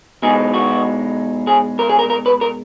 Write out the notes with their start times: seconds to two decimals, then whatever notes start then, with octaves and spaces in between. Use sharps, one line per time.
0.22 B2 G#3 D#4 G#4
0.54 F#4
1.47 G#4
1.79 A#4
1.89 G#4
1.99 A#4
2.10 A#4
2.26 B4
2.41 A#4